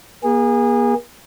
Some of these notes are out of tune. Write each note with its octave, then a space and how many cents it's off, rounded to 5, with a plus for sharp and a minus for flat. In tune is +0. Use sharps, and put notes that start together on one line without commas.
A#3 +45 G#4 -25